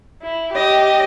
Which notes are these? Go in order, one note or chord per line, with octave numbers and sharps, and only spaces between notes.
E4
G4 D#5